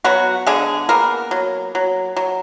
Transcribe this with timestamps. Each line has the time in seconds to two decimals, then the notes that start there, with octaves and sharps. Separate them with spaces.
0.04 F#3 B3 F#4
0.47 D3 G#3 G#4
0.89 A#3 B3 A#4
1.31 F#3
1.75 F#3
2.16 F#3